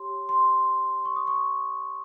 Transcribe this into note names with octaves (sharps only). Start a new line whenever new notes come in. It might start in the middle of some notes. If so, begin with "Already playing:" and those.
Already playing: G4 C#5 C6
C6
C#6
D#6
C#6